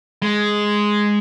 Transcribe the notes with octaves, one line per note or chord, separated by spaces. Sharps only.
G#3